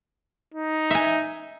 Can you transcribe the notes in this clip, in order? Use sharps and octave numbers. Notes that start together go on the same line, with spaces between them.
D#4
E5 G#5